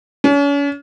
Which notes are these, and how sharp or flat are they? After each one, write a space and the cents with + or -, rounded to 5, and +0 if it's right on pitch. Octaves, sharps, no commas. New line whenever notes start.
C#4 +40